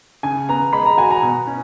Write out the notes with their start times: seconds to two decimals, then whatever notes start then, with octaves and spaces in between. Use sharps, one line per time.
0.23 C#3 G#5
0.49 B3 A#5
0.73 G#3 B5
0.86 A#5
0.98 F#4 G#5
1.11 A#5
1.23 B2
1.47 C#4